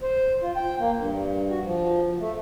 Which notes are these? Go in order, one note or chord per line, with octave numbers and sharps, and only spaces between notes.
C5
F4
G5
A#3
G2
F#4
F3
A3